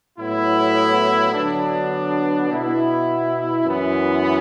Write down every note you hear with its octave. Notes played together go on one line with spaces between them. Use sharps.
A2 F#3 B3 E4
D3 F#3 B3 D4
B2 B3 E4
F#2 E3 B3